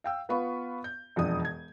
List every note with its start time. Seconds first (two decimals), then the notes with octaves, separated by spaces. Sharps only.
0.04 F5 G5 E6
0.29 B3 F4 B4 F5 B5 C#6
0.84 G6
1.16 E1 F2 D4 D#6
1.45 G#6